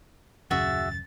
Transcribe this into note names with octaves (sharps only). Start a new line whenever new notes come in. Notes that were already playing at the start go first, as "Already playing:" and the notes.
D#1 F#2 C#3 F#4 G#4 E5 A6